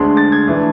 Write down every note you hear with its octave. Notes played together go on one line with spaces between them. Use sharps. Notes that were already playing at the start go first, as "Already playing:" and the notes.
Already playing: D2 D3 G#3 D4 C6
A6
G#6
E3 A3 D4